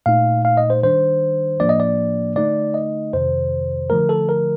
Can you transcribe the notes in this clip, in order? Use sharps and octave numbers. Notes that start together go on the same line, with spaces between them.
A#2 A3 D#4 F5
F5
D#5
C5
D#3 G3 D4 C5
A2 F3 A#3 D4 D5
D#5
D5
D3 A3 D#4 D5
D#5
F2 C3 D#3 C5
D3 F3 A3 A#4
A4
A#4